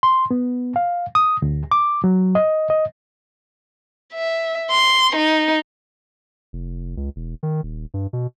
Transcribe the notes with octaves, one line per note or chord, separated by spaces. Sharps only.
C6
B3
F5
D#6
D2
D6
F#3
D#5
D#5
E5
C6
D#4
F1
C#2
E1
D#3
D#1
G2
B2